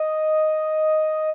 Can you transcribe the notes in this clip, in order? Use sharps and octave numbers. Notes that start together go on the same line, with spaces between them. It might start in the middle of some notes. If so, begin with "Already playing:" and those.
Already playing: D#5